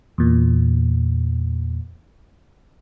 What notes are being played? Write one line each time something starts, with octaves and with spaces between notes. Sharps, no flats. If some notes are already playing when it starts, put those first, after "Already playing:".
E2 A#2